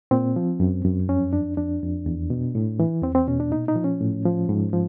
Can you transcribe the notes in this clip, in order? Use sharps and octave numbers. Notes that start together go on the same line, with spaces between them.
A#2 C4
F3
F#2
F#2
F2 C#4
F2 D4
F2 D4
F2
E2
B2
A2
E3
E2 C4
C4
B2 C#4
D4
A#2 D#4
D#4
F3
C#4
A2
F3
G#2
F3